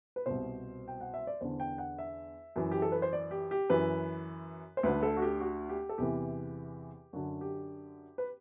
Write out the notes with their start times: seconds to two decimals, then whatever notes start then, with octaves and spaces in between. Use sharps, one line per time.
0.16 B4
0.26 C2 B2 C5
0.88 G5
1.01 F#5
1.14 E5
1.27 D5
1.41 E2 D3 C5
1.60 G5
1.78 F#5
1.99 E5
2.56 F#2 E3
2.72 G4
2.82 A4
2.92 B4
3.02 C5
3.13 D5
3.31 G4
3.51 G4
3.70 F#2 E3 B4
4.77 C5
4.83 D2 D3 B4
5.03 A4
5.17 F#4
5.22 G4
5.41 F#4
5.69 G4
5.89 A4
5.98 E2 C3 E3 G4
7.13 F#2 D3 F#4
7.41 G4
8.18 B4